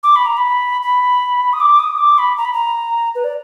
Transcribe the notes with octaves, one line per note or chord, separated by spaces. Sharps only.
D6
B5
A#5
B5
B5
D#6
D6
D#6
D6
B5
A#5
B5
A#5
B4
D5